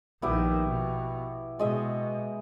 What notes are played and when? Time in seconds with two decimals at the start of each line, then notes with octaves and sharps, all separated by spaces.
0.22 A#1 D#3 B3 E4 G4
0.67 B2
1.59 B2 G#3 D#5 E5